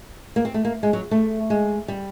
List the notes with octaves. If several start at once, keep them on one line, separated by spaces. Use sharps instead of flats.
A#3
C4
A3
A#3
G#3
F#3
A3
G#3
G3